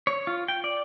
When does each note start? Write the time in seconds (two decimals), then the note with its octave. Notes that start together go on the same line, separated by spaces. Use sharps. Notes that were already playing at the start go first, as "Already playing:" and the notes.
0.07 C#5
0.27 F4
0.48 G5
0.64 D5